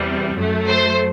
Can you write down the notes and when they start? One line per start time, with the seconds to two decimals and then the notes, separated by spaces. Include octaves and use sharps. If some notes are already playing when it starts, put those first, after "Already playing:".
Already playing: E2 C3 G3
0.35 F#2 F#3 A3
0.68 C5